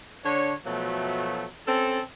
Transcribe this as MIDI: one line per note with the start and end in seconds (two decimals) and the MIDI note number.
0.24 0.53 50
0.24 0.53 62
0.24 0.53 73
0.65 1.46 47
0.65 1.46 53
0.65 1.46 54
0.65 1.46 57
1.67 2.00 60
1.67 2.00 61
1.67 2.00 69